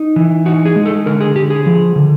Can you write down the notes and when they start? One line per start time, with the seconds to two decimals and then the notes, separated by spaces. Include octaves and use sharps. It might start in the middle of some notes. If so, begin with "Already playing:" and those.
Already playing: D#4
0.16 E3
0.45 D#4 F#4
0.66 G#4
0.76 G#3
0.86 A4
1.06 D3 A#4
1.21 G#4
1.35 D3 G4
1.50 G#4
1.66 F3
1.96 D3